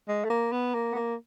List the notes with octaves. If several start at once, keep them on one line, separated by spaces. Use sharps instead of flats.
G#3
A3
A#3
B3
A#3
B3
A#3